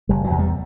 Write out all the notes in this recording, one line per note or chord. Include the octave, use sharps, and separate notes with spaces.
F#1 G3
F#3
E2 C3
G3